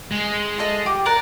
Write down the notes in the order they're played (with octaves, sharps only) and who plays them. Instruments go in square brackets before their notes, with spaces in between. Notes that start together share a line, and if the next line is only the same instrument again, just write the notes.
[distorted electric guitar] G#3
[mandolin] F4 A4 D#5
G4
[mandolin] A#4 F#6 [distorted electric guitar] D5